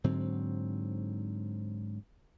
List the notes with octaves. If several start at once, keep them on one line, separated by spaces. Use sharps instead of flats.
G#2 D3 F#3 C4